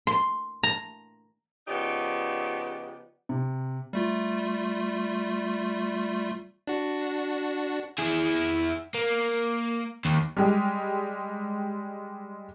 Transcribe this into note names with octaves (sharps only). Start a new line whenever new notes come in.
C6
A#5
C#3 F3 B3 D#4 G4 D5
C3
G3 A3 F4
D4 F#4
E4 G#4
A#3
D#2
G3 G#3 G4